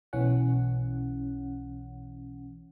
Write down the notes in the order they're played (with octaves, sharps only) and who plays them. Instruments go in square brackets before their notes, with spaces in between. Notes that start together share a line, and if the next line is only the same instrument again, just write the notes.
[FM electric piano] B1 E3 C#4 F#5